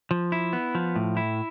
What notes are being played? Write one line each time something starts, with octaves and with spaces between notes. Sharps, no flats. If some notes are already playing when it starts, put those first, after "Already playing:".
F3
E4
B3
F3
A2
E4